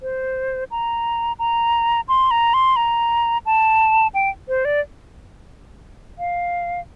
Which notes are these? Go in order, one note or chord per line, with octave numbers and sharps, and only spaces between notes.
C5
A#5
A#5
C6
A#5
C6
A#5
A5
G5
C5
D5
F5